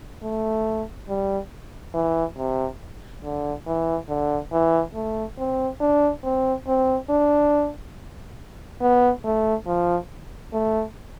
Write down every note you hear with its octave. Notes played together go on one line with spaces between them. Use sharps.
A3
G3
E3
C3
D3
E3
D3
E3
A3
C4
D4
C4
C4
D4
B3
A3
F3
A3